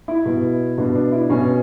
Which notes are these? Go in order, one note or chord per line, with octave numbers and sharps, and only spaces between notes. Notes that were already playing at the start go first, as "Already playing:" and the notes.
E4
B2
B2 D4
D4
E4
B2 C#4